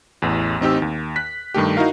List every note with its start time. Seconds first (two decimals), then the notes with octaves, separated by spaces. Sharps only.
0.22 A1 E2
0.61 A1 C4 D#4 G4 E6
0.82 D#2
1.16 F#6 B6
1.54 G2 D#3 A3 G4
1.77 D#4 E4 F#4 A#4 F5